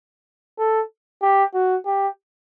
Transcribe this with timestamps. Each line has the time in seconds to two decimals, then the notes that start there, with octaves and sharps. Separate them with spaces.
0.59 A4
1.22 G4
1.54 F#4
1.86 G4